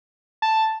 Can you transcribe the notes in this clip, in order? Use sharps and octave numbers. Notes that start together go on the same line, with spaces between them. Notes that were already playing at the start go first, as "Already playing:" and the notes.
A5